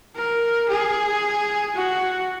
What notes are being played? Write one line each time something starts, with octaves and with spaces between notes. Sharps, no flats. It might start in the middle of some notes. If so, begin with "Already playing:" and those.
A#4
G#4
F#4